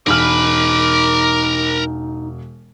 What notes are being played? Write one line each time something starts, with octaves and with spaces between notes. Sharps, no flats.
E1 D#4 A#4 B5 D6 F6